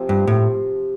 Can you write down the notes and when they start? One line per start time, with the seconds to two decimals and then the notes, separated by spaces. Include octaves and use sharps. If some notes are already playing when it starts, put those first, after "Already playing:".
Already playing: C3 F3 C4
0.09 G2
0.27 A2